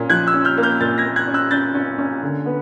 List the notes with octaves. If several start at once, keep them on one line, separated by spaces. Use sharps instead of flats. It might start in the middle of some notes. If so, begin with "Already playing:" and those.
Already playing: A#2 C#4
F3 F#6 G#6
E6 F#6
C#4
F6 G6
A#3
F6 G6
A#2 G6 A6
G#6 A#6
A#3
F#6 G#6
C#4
E6 F#6
C#4 G6 A6
C#4
C#4
D3
B3